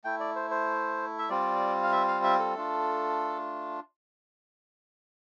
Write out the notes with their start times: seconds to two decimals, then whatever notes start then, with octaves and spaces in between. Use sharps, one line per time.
0.04 A3 E4 G5
0.20 D5
0.36 C5
0.51 C5
1.19 E5
1.29 G3 C4 F4 D5
1.83 F5
1.92 E5
2.08 F5
2.23 E5
2.39 A4
2.55 A3 D4 F4